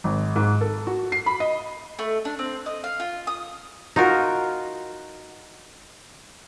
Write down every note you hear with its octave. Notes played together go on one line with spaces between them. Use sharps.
G#1
G#2
A4
F#4
C7
B5
D#5
A3
D4
C4
D#5
F5
F4
D#6
D#4 F4 F#4 A#4